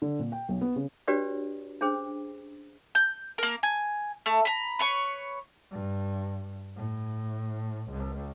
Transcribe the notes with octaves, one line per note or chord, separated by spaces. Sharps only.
D3
A#2
G5
B1
B3
C#3
D4 F#4 G4 B4 C#5 D5
C#4 D4 G#4 C5
G6
A#3 A#4
G#5
A3
A#5 B5
B4 C#5 C#6
G2
A2
C#2